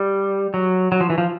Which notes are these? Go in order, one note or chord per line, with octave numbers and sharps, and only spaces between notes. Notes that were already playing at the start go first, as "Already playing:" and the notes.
Already playing: G3
F#3
F#3
F3
E3
F3